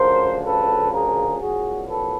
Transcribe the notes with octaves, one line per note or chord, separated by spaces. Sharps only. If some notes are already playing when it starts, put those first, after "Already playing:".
Already playing: D2 C#3 F3 A#4 C5
A4 B4
G#4 A#4
C2 A#2 F#3 F#4 G#4
A4 B4